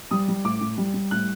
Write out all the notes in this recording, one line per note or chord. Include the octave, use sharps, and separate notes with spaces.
G3 D#6
G3
A2 D6
A2
G3
G3
A2 F#6